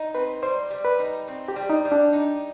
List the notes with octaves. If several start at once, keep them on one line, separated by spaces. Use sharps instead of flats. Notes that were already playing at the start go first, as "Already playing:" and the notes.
Already playing: D#4
C4 B4
G3 C5
G3
B4
D#4
C4
G4
G3
D#4
G3
D4
D#4